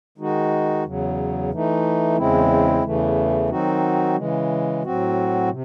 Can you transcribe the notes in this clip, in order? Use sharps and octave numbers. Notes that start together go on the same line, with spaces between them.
D#3 G#3 D#4 F#4
E2 C#3 F#3
E3 A3 D#4
E2 C#3 G#3 C4 E4
E2 C#3 E3 A3
D#3 F#3 C4 D#4 F#4
C#3 E3 G#3
A2 F#3 C4 F#4
C3